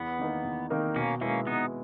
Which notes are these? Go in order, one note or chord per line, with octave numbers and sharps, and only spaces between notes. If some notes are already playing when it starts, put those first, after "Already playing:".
Already playing: E2 B3
D#3 A#3 D#4 A#4
E2
D#3 A#3 D#4 A#4
B2 A#3 C#4
G#3 A#3 B3 C#4 E4
B2 B3 D#4